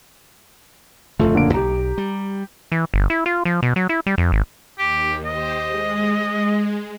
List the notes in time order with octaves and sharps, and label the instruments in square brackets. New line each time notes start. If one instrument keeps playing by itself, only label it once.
[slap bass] D1 F2 C#3 [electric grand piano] A3 F4 A4
[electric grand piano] D3 A#3 D7
[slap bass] B1 [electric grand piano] G4 A#5
[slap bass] G3
[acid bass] E3
G1
E4
F4
F3
B2
F#3
E4
G3
F2
G#1
[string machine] D#2 [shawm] G4
[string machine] G4 C5 [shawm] D#5
[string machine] G#3